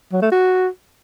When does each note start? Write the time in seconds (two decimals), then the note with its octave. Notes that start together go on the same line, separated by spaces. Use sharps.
0.12 F#3
0.22 A3
0.32 F#4